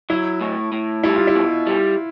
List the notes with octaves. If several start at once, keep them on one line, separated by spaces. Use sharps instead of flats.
F#3 E4
A2
A2
G3 E4
F4
E4
B2
G3